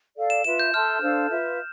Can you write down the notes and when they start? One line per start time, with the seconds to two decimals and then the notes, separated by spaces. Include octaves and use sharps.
0.16 A4 D5 F5
0.30 E7
0.44 F4 B4 E5 E7
0.60 G6
0.73 A4 E5 A5 C6 F6
1.02 D4 A4 C5 F5
1.30 F4 B4 E5